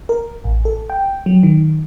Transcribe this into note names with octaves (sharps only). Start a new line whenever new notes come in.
A#4
A1
A4
G5
F#3
D#3